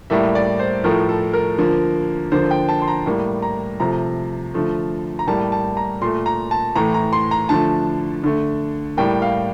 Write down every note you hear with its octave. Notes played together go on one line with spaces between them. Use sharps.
A2 G3 A#3 E5
D5
C5
A2 F3 A3 A#4
A4
A#4
D3 F3 A#3
D3 F3 A#3 C5
G5
A5
C6
A#5
A2 G3 A#3
A#5
C3 F3 A3 A#5
D3 F3 A3
A#5
A2 G3 A#3 A5
A5
A#5
A#2 A3 C6
A#5
A5
A2 E3 A3 A#5
A#5
C6
A#5
D3 F3 A3 A5
D3 A3
A2 G3 A#3 G5
F5